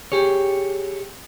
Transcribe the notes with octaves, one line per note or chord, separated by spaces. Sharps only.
G4 G#4 C#5